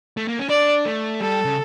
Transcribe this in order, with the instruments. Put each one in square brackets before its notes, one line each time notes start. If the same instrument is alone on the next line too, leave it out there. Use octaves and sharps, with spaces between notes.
[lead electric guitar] A3
A#3
C#4
[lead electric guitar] D4 [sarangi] D5
[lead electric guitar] A3
[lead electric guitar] G3 [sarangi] A4
[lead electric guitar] C#3